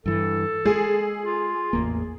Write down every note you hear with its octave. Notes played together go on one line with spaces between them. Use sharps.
G2 E3 A4
G#3 G#4
F4
A1 E2 A#3